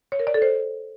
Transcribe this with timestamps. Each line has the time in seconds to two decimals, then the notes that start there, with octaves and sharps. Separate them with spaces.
0.12 C#5
0.19 A#4
0.27 D5
0.34 A4
0.42 C5